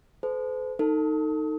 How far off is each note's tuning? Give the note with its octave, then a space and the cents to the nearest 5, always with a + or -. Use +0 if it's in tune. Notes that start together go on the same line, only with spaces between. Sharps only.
A4 -35 C5 -45
D#4 +0 A4 +30